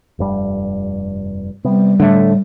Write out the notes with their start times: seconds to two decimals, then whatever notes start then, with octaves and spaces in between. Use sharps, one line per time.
0.19 F1 G2 G3
1.64 C3 G3 B3
2.00 A2 D3 A3